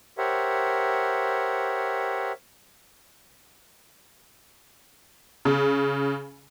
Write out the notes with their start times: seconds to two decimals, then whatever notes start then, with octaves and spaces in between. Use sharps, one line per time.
0.18 G4 A#4 C5 C#5 E5 F#5
5.45 C#3